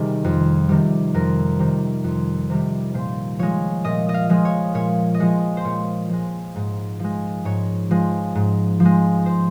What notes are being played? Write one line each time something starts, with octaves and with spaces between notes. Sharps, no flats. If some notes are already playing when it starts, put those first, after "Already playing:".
Already playing: C3 D#3 G3 G#4
F2
C3 D#3 G3
F2 A#4
C3 D#3 G3
F2
C3 D#3 G3
A#2 C5
F3 G#3 C#5
A#2 D#5
D#5
F5
F3 G#3
C#5
A#2 C#5
D#5
F3 G#3 C#5
C5
A#2 C#5
F3 G#3
G#2
F3 G#3
G#2 C#5
F3 G#3
G#2
F3
G#3
C5